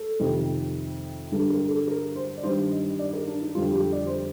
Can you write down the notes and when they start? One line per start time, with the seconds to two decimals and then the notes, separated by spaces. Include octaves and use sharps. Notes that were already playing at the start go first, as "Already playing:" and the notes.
Already playing: A4
0.20 F2 C3 D#3
1.32 G2 D3 G3 A4
1.50 A#4
1.68 A4
1.88 A#4
2.16 C5
2.37 D5
2.44 G2 D#3 G3 C5
2.71 D#5
2.99 D5
3.13 A#4
3.27 D4
3.42 D#4
3.55 F2 D3 G3 F4
3.74 G4
3.92 D5
4.07 C5